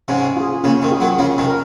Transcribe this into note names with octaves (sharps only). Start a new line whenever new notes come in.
G#2 C3 C#4
F4 G#4
A#2 C#3 C#4
C3 D#3
F4 G#4
D#3 F#3
C#3 F3 C#4
C3 D#3
A#4